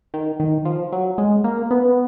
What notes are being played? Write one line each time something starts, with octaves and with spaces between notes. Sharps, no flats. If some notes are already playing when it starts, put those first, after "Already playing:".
D#3
D#3
F3
F#3
G#3
A#3
B3